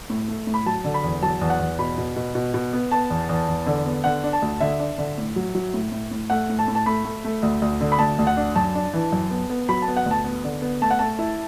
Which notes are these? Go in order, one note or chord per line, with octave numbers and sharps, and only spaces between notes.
A2
A3
A2
B5
F#3 A5
D3
B5
E2
F#3 A5
E2
F#5
E2
B2 B5
B2
B2
B2
B2
B3
B3 A5
E2
E2
E2
D3
B3
D3 F#5
D4
A5
D2
D3 E5
D4
D3
A2
F#3
F#3
A2
A2
A2
A3 F#5
A2
A5
A2
A5
A3 B5
A3
A3
D2
D2
D3
B5
D2 A5
D2
F#5
D4
F#2 A5
D4
E3
F#2
B3
B3
F#3 B5
A5
B3
F#5
D2
A5
B3
D3
B3
A3 A5
F#5
A3 A5
E4